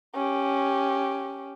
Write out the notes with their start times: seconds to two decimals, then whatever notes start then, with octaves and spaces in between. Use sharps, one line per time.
0.15 C#4 G4